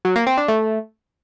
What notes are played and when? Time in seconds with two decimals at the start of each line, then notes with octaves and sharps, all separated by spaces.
0.05 F#3
0.16 A#3
0.27 C4
0.37 D4
0.48 A3